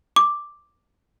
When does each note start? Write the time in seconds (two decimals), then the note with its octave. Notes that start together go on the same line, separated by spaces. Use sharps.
0.16 D6